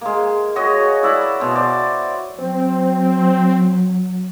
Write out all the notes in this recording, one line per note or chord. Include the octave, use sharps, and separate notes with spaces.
G#3 A#3
F#4 G#4 C#5 D#5
E4 D5 E5 F#5
B2 C6
C5 D5
F#3 C4